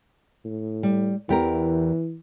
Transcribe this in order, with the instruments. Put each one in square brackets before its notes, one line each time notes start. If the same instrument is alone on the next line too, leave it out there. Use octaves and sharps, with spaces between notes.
[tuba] A2
[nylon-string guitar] G3
[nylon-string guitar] E2 G4 A#4 [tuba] E3